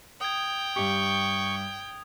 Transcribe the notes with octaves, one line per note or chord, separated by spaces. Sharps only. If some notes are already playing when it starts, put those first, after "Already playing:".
G5 D#6 G#6
G2 G4 C#6